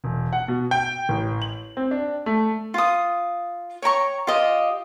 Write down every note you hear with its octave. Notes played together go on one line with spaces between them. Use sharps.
E1
F#5
B2
G5
A1
F#7
C4
D4
A3
F4 D#6
C#5 G5 A#5 C#6
F4 G4 D#5